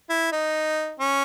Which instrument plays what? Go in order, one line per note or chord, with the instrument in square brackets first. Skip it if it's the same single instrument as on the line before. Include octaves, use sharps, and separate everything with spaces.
[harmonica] E4
D#4
C#4